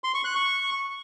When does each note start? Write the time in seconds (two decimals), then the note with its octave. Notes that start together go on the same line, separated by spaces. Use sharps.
0.04 C6
0.14 C#6
0.25 F#6
0.35 C#6